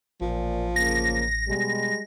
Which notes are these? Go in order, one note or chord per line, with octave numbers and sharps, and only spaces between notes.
A1 A#2 F3
C#3 A#3 A#6
B2 G3 G#3